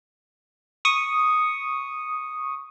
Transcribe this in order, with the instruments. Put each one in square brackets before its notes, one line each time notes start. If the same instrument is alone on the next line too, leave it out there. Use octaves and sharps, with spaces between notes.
[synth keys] C#6 D#6